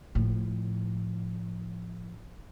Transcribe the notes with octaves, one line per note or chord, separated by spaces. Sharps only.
A2 F3